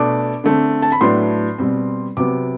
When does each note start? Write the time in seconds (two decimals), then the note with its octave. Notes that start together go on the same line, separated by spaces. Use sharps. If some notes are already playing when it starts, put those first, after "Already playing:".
Already playing: B2 A3 D4 D6
0.44 D3 A3 C4
0.82 A5
0.92 B5
1.01 A2 F#3 B3 D4 C6
1.58 B2 G3 C4
2.17 C3 F#3 B3 D6